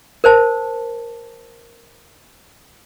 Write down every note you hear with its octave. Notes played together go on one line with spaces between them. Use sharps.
A#4 C5 A5